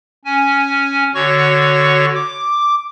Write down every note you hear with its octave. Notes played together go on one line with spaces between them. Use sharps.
C#4 G#5
D3 F#4 C#5 C#6
D6